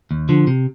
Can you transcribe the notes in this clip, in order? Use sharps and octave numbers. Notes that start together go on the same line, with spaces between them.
D#2
D3 F3
C3